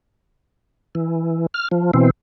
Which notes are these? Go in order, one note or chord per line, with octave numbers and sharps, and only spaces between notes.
E3
F6
F3
B2 E3 C4